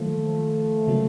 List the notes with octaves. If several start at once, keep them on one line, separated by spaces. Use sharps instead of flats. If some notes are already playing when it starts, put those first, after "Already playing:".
Already playing: D#3 F3 F#3 A3 A#3
C#3 F#3 A#3